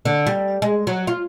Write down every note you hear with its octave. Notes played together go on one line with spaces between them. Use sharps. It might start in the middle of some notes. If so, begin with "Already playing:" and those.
D3
G3
G#3
F#3
F4